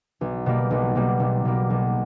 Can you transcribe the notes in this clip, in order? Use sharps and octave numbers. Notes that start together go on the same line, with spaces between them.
B1
B2 G3 A#3
B1
B2 G3 A#3
B1
B2 G3 A#3
B1